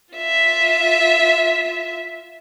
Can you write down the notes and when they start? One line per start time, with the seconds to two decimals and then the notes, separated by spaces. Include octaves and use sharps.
0.15 F4 E5